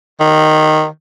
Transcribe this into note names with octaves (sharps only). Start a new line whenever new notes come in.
D#3